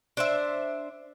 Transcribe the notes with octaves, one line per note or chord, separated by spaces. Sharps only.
D4 C5 E5